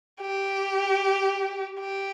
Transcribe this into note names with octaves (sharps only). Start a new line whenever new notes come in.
G4
G4